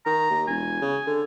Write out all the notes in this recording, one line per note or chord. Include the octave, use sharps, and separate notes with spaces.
D#3 A#5
D#2
E1 G#5
C#3
D3